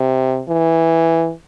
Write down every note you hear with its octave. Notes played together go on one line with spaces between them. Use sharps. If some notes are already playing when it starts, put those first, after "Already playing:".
Already playing: C3
E3